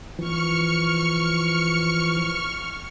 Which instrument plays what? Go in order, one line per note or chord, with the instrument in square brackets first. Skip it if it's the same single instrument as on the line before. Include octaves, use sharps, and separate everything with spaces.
[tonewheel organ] E3 F3 [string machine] C#6 F6 C#7